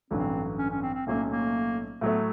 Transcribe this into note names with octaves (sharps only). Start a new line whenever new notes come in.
A1 G2 D3 F#3 C4
C#4
C#4
C4
C4
B1 A2 F#3 A3 A#3 C#4
A#3
A2 F#3 A3 B3